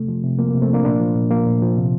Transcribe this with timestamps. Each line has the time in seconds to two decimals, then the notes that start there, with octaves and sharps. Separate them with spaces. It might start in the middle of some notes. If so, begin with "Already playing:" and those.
Already playing: C3 A3
0.08 F3
0.24 C3
0.39 F3 A#3
0.51 A#3
0.54 C3
0.62 A3 C4
0.69 F3 A#3 D4
0.85 A#2 A#3 D4
1.00 F3
1.16 A#2
1.31 F3 A#3
1.46 A#2
1.62 F3
1.77 C3